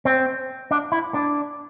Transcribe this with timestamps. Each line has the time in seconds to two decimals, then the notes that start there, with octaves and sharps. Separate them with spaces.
0.05 C4
0.71 D4
0.92 E4
1.14 D4